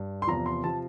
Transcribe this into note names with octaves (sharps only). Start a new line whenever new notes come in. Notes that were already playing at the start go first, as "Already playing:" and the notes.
Already playing: G2
C6
E2 C3 F3 A#5
C6
C3 F3 A5